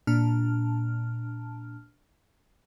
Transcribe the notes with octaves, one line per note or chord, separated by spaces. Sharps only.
A#2 D4 A5 F6